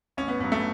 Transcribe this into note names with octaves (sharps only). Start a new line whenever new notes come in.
A1 C#4
B3
G2 F#3 B3
A3